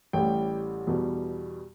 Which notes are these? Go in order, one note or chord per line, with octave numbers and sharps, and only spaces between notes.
A1 A2 G3 G5
E2 B2 G3